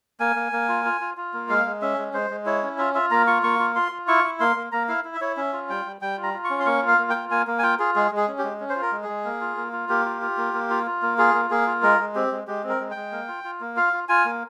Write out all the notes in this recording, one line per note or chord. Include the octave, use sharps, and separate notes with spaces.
A#3 G#5
A#3
A#3
F4
F4
F4
F4
A#3
G#3 F5
G#3
C#4 E5
G#3
G#3 C5
G#3
E4 C#5
C#4
F4 E5
F4 E5
A#3 A#5
F4 C#6
A#3 C#6
F4
F4 C6
F4
E4 C#6
E4
A#3 C6
A#3
A#3 A#5
E4 F5
E4
E5
E4 C#5
C#4 E5
F4
G3 G5
G3
G3 G5
F4
A#5
F4
C#6
C#4
C6
A#3 C#6
F4
F5
A#3
F4 G5
A#3 G#5
A#3
G#5
F4 G5
F4 G#4
G#3 G#4
G#3
G#4
C#4
G4
G#3
C#4
C5
F4
A#4
G#3
G#4
G#3
A#3
F4
A#3
F4
A#3 G4
F4
F4
A#3
A#3
F4
F4
A#3
F4 G#4
A#3
A#3 G#4
F4
G#3 A#4
G#3
C4 G4
G#3
G#3 G4
C4
A#4
G#3
G5
G#3
A#3
F4
F4
A#3
F4 F5
F4
F4 G#5
A#3